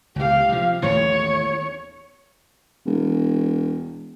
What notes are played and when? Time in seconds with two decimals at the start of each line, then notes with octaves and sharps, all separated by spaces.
0.16 C#2 G4 F5
0.49 C3 F3
0.82 A1 D#2 A3 C#5
2.86 E1